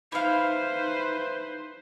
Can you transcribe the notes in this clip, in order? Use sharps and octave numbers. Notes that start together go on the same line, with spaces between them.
D#4 E4 B4 C5 F5